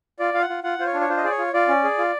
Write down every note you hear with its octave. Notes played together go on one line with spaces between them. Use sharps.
F4 D5
F4 F5
F#5
F4
F4 F#5
F4 C5
C#5
D4
C#5
F4 C5
D#5
G#4 D5
C#5
F4
F4 D5
C#4
G#4
F4